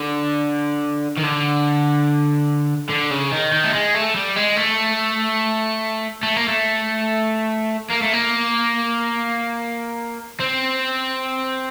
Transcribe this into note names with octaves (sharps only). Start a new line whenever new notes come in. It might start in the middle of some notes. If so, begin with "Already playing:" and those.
Already playing: D3
D#3
D3
D3
C#3
D#3
D#3
A3
G#3
A3
G3
G#3
A3
A3
A#3
A3
A#3
A3
A#3
C4